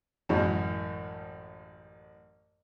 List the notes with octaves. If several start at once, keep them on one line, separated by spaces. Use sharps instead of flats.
A1 F#2 A2 G#3 F#4